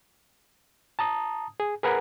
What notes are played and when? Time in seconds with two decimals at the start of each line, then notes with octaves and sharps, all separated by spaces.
0.99 A5 A#5 D#6
1.60 G#4
1.83 G#4 A#4 B4 F#5 G#5 A#5